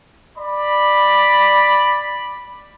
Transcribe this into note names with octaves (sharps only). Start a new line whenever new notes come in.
D5 B5